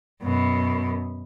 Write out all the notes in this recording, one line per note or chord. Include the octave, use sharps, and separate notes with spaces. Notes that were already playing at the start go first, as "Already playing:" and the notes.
F#2 B2